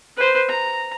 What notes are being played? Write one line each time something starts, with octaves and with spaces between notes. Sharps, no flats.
B4 C5
A#5